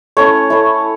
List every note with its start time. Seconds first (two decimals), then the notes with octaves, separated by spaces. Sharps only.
0.17 A3 C#4 E4 C#5
0.50 A3 C#4 E4